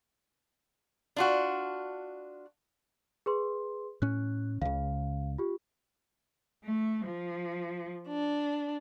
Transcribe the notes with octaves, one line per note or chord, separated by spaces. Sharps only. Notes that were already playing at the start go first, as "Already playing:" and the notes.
D4 F4 F#4
G#4 B4 C6
A2 C#4 F#6
C#2 C#3 F5
F4 G4
A3
F3
D4